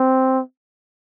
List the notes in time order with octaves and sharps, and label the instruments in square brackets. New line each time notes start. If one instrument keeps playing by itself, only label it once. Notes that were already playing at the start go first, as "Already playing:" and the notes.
Already playing: [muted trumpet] C4